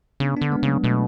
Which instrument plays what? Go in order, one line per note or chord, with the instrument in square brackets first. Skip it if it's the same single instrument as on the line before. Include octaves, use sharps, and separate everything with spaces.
[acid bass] C#3 [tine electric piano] B3 D4
[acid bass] D3 [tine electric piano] B3 D4
[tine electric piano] G#3 B3
[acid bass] C#3
[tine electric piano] F#3 A3
[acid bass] B2 [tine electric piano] F#3 A3